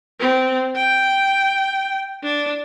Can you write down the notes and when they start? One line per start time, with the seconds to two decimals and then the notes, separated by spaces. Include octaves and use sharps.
0.20 C4
0.76 G5
2.23 D4